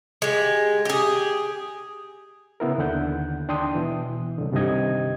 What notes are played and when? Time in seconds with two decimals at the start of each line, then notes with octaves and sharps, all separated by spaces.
0.22 G#3 G4
0.85 G4 G#4
2.60 C#3 B3 E4 A#4
2.78 D#2 D3 F#5 G6
3.48 D#2 D4 G5 C6 D#6
3.75 B2 E3
4.38 C2 D3
4.52 G2 C3 D#3 G4 D#5 G#6